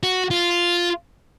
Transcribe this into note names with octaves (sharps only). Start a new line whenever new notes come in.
F#4
F4